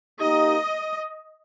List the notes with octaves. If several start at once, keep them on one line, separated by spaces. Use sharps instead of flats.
A#3 D#4 G4 D#5